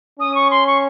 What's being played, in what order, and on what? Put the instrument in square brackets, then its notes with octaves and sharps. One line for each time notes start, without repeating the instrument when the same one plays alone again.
[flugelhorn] C#4 [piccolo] D#6
[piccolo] C#6
C6
C#6